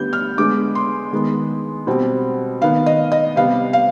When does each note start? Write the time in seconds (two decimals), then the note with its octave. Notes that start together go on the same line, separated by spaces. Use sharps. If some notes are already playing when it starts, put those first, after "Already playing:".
Already playing: D3 G3 B3 G6
0.13 F6
0.37 D3 G#3 B3 D6
0.75 C6
1.12 D#3 G#3 B3
1.87 B2 G3 C4
2.62 D#3 B3 F5
2.86 D#5
3.12 D#5
3.36 C3 G3 B3 F5
3.73 F5